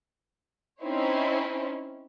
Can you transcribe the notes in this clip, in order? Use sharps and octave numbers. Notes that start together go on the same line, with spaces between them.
C4 C#4 D#4 E4 C5 C#5